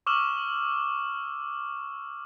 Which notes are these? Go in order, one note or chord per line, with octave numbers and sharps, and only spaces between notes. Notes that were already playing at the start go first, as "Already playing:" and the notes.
C#6 D6 E6 F6 E7 F#7